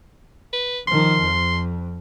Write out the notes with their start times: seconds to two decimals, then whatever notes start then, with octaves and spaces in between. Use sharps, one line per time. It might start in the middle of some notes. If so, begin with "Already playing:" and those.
0.53 B4
0.88 D#3 F3 C6
1.22 F2